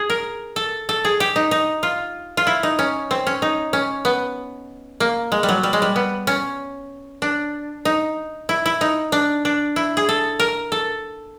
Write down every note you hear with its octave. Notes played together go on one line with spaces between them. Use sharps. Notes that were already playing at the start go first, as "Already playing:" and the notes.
Already playing: G#4
A#4
A4
A4
G#4
G4
D#4
D#4
F4
F4
E4
D#4
C#4
C4
C#4
D#4
C#4
B3
A#3
G#3
G3
F#3
G3
G#3
G3
B3
C#4
D4
D#4
E4
E4
D#4
D4
D4
E4
G#4
A4
A#4
A4